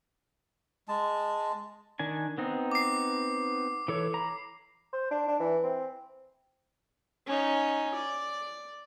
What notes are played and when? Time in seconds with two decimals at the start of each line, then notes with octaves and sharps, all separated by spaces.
0.88 G#3 A5
1.99 D#3 D4 G#5
2.38 B3 C4 D#4
2.72 D6 C7
3.88 E3 A4 C#5
4.14 A#5 B5
4.93 C5
5.11 D4
5.28 D4
5.40 E3
5.63 C4
7.27 C#4 D#4
7.96 D5